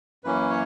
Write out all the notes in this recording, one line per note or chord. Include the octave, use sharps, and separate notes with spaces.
F#2 E3 A#3 C#4 B4
C#5